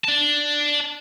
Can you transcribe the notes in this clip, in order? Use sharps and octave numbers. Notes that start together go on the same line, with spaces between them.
D5 A5